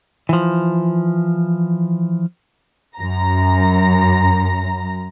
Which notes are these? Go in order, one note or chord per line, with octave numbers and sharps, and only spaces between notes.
E3 F3
F#2 A#5